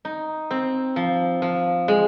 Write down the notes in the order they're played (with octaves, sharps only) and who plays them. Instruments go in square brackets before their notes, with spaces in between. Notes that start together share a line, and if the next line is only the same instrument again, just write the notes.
[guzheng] D#4
C4
F3
F3
G#3